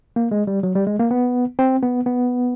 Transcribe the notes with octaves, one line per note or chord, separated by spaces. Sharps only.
A#3
G#3
G3
F#3
G3
G#3
A#3
B3
C4
B3
B3